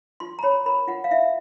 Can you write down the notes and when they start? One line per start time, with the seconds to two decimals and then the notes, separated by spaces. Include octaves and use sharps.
0.20 F4 C6
0.39 A#5
0.43 C#5 B5
0.66 A#4 B5
0.88 F4 F#5
1.04 F5
1.11 E4 E5